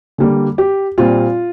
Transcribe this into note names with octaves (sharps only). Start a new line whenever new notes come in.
D3 G3 A#3
G4
A#2 G3 C4 F4